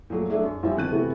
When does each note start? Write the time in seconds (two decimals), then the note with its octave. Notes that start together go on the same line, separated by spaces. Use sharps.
0.10 A#2 F3 F#3 A3
0.30 F#3 A3 D4 G#4 E5
0.44 F#2
0.63 A#1 F#2 G3 E5
0.76 F2 B2 D#3 F#6 D#7
0.91 C3 E3 A3 B3 F#4